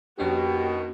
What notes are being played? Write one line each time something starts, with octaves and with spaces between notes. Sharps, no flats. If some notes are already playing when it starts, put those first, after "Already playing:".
F2 B2 D#3 A#3 C#4 D4 F#4 G4